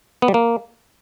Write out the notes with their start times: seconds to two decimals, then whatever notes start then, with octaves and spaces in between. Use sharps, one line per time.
0.22 B3
0.28 G3
0.34 A#3